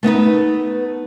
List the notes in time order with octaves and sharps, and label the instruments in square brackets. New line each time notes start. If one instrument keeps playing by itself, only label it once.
[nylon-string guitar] A3 B3 D#4 B4